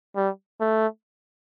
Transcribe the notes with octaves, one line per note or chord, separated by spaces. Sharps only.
G3
A3